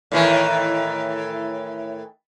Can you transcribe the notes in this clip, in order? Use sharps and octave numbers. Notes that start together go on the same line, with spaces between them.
A2 D#3 E3